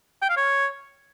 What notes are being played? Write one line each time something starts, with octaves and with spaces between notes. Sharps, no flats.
G5
F5
C#5